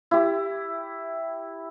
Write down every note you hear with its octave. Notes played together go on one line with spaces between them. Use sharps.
E4 G4